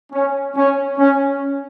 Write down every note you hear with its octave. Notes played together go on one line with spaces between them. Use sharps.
C#4
C#4
C#4